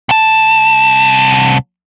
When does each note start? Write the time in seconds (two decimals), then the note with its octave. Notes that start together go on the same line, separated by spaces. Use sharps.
0.09 C2 A5